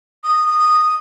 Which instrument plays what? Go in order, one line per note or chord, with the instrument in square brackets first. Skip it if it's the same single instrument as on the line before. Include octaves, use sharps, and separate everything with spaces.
[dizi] D#6